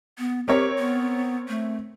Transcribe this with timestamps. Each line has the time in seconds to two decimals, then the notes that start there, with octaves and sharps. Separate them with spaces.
0.19 B3
0.48 C4 G4 A#4 C#5
0.78 B3
1.48 A3